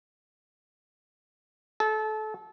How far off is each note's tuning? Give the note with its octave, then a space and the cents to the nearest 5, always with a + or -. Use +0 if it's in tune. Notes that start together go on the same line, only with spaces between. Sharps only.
A4 -25